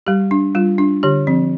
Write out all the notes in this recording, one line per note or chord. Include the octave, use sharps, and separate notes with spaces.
G3 G4
D4
G3 F4
D4
D3 G4
F3 C4